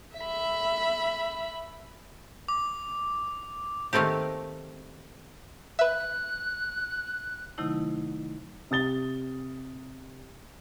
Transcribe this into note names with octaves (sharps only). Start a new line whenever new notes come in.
E5 B5
D6
D#3 A3 A#3 C4 G4
B4 E5 F#6
C3 D#3 F#3 A3 D#4 E4
C3 D#6 A6 G7